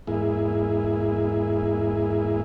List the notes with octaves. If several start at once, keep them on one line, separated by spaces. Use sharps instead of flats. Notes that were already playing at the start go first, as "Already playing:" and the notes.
E2 G#2 A#3 E4 G#4